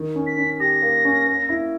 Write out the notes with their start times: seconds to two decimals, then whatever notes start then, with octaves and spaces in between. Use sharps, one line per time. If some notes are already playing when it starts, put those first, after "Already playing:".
Already playing: D#3
0.15 C#4
0.27 B6
0.38 C#4
0.60 G4 A#6
0.82 A#3
1.05 C#4
1.27 A#3
1.49 E4